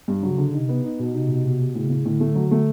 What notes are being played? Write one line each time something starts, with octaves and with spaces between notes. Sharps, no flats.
G2
C#3 F#3
D3
C3 D#4
B3
D#4
B2
C3 D#4
B2
B2
B2
A2 C#3
A2
A2 D3
A3
F#3
A3